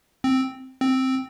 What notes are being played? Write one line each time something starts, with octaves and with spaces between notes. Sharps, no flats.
C4
C4